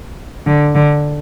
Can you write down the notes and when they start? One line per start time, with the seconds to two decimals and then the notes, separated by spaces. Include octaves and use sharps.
0.47 D3
0.75 D3